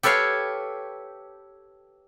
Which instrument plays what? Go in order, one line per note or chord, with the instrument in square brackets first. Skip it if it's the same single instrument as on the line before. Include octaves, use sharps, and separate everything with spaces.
[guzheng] G4 A4 B4 C#5 F5